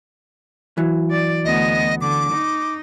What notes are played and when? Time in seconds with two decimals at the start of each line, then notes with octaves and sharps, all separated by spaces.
0.78 E3 F#3
1.11 D5
1.45 D2 B3 D#5
2.01 D3 D6
2.32 D#4